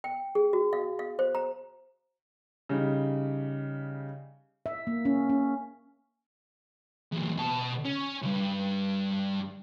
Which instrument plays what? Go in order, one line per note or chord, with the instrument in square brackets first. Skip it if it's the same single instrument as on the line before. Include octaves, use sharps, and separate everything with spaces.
[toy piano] G5
G#4
F#4
F5
F5
C5
A#5
[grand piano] C#3 G3 D#4
[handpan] E5
A#3
C#4
C#4
[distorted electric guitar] E2 A#2
B2 A5
C#4
C2 G2